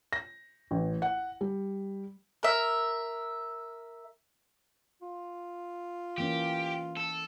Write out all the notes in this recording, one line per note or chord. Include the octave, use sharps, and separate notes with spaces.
A#6
A1
F#5
G3
A#4 E5
F4
E3 A#3 C#4 G4
A4